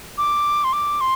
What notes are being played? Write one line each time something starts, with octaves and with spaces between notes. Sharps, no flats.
D6
C6
D6
C6